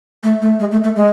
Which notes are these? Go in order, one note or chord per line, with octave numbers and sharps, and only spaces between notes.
A3
A3
G#3
A3
A3
G#3